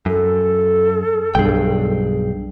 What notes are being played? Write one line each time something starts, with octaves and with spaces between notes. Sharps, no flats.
F#2 A4
B1 G2 G#4 G5